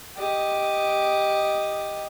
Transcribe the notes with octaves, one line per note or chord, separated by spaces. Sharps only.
G4 D#5